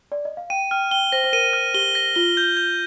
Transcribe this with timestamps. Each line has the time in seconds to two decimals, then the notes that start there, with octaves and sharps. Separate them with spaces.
0.12 D5
0.25 D#5
0.37 F5
0.50 G5 D#7
0.71 G5 F6
0.91 G5 G7
1.12 C5 A#6
1.24 C5
1.33 A#4 D#7
1.53 F6
1.74 G4 G7
1.95 A#6
2.16 F4 G7
2.37 G6
2.57 G6